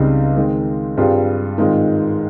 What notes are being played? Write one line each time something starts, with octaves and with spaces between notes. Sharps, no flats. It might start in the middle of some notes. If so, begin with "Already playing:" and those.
Already playing: C#2 C#3 G3 C4 D#4
D#3 G#3 C4
G2 G3 C4 F4 G#4
G#2 D#3 G#3 C4 F4